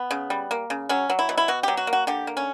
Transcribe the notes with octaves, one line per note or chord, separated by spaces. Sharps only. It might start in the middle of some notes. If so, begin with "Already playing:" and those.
Already playing: B3
C#3
G3
A#3
C#3
F#3 C#4
F#3
E4
B2
E4
B2 F#4
F#3 G4
F#4
A#3
F#4
D3 G4
A#3
C#4